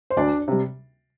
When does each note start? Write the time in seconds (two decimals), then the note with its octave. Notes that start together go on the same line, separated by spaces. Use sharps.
0.10 C5
0.17 D2 D4 D5
0.48 C3 G3